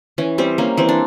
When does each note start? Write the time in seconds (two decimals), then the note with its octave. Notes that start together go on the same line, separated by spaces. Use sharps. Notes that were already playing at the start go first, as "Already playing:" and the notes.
0.18 E3 C#4
0.38 G3 C4
0.58 A#3 C#4
0.77 E3 C4
0.89 D4